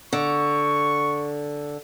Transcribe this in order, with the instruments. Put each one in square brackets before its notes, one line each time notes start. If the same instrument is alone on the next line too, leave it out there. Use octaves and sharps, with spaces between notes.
[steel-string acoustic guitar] D3 [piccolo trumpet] C#6